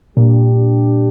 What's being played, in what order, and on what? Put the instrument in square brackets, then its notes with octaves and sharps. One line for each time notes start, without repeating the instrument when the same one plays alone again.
[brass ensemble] G2 G3 D4 G4 [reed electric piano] A#2